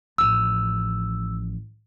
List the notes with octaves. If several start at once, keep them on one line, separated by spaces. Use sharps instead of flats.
A1 F3 E6